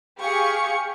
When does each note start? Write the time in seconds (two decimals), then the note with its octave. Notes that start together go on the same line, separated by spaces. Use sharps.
0.21 G4 G#4 F5 C#6 C#7